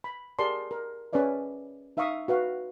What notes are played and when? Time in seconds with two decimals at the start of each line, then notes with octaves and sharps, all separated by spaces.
0.04 B5
0.39 G4 G#4 A#4 D5 A5 C6
0.71 A#4
1.13 C#4 G#4 B4 D5 E5
1.97 D#4 E5 F5 A#5 C#6 D#6
2.28 F#4 B4 F5 F#5